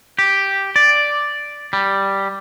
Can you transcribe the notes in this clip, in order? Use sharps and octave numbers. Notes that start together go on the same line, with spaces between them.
G4
D5
G3